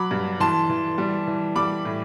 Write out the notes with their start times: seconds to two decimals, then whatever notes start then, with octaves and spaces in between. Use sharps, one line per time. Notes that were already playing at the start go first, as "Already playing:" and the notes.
Already playing: F#3 B5 D6
0.11 G2
0.40 E3 A5 C6
0.70 E3
0.98 G3
1.27 E3
1.56 G3 B5 D6
1.85 A2